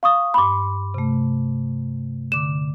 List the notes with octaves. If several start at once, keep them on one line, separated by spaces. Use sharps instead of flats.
F5 C#6 D#6
G2 B5 C6 D6
C3 A3
D3 D6 E7